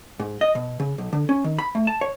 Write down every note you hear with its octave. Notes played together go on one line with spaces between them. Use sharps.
G#2
D#5
B2
C#3
B1
D3
C#4
D#3
B5
A3
A5
C#5